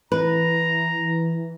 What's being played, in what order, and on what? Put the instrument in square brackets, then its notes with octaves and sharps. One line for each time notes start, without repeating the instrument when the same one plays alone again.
[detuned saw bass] E3 [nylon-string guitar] B4 [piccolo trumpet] A#5